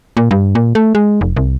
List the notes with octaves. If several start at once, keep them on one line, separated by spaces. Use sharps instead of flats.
A#2
G2
A#2
A3
G#3
F1
C2